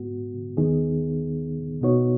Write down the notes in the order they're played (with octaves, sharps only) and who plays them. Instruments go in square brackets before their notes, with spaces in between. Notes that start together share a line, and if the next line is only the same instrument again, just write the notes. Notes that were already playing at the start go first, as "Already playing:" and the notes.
Already playing: [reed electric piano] G#2 G#3 B3 F#4
D#2 D#3 B3 D#4 G#4
B2 B3 D#4 F#4 C#5